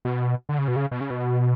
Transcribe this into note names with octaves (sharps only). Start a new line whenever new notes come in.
B2
D3
C#3
B2
C#3
B2
C#3
B2